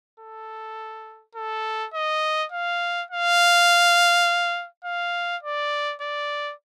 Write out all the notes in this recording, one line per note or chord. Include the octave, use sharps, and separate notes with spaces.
A4
A4
D#5
F5
F5
F5
D5
D5